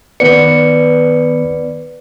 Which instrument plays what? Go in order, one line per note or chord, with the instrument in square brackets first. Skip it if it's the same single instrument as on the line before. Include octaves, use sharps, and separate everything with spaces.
[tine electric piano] D#3 B3 C#7 [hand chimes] B4 D5